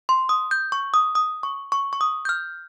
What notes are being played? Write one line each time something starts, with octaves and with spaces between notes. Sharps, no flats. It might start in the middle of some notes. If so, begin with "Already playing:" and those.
C6
D#6
G6
C#6
D#6
D#6
C#6
C#6
C#6
D#6
G6
F6